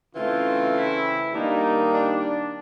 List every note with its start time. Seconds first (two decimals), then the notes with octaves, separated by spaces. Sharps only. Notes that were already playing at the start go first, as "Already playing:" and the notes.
0.14 C#3 E3 A3 C4 F4
0.74 E4
1.33 D#3 G3 A#3 D4 D#4
1.92 D4